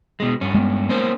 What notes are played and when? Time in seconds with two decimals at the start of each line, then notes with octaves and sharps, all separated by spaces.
0.20 B2 G#3
0.41 G2 C#4
0.55 G#3 B3
0.89 A#3 C#4 C5